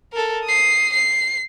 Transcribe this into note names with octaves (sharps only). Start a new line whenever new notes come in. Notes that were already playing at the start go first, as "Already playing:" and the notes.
A4 A#4
D#6 C7
C7